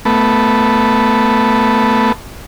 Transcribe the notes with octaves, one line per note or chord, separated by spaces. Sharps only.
A3 B3